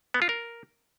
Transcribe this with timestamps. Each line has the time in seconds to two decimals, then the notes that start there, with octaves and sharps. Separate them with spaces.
0.14 B3
0.22 F4
0.29 A#4